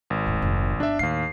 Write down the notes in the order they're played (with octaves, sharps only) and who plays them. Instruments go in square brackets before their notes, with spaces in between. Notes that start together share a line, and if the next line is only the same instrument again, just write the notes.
[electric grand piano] G#1
[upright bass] D1 G#2
F1
[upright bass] G1 [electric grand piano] D4 E5
[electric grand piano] D#2 F5 C7 [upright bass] A2